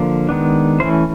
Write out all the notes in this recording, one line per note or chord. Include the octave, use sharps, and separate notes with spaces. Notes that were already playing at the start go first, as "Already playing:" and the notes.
Already playing: D3 F3 A#3
D#3 G#3 B3 D4
E3 A3 C#4 E4 C5